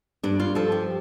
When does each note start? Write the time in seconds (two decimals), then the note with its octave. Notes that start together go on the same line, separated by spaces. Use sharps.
0.23 G2 D4
0.40 F4
0.55 F3 A4
0.72 G4